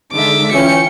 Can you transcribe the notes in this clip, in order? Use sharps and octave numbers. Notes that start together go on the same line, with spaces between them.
D3 D#3 G#3 E5 D6
E3 C#4 F4 G5 C#7